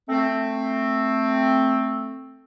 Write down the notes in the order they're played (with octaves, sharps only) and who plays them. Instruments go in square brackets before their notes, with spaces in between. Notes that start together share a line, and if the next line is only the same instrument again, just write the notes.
[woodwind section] A3 C4